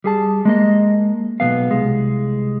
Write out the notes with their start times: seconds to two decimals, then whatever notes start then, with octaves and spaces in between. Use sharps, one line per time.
0.04 G3 G#4 A5
0.45 G#3 A#3 D#5
1.40 B1 C#3 B3 F5
1.71 C2 G#3